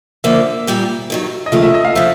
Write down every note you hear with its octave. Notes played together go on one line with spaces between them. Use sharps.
D3 F3 A#3 E5
A#2 G3 A#3
G2 D#3 F#3
D#5
D#2 C#3 F3 A3 E5
E5
D#5
F5
C3 F3 A3 E5